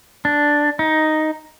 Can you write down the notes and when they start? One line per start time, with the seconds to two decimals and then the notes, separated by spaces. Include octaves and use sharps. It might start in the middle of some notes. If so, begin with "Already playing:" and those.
0.25 D4
0.79 D#4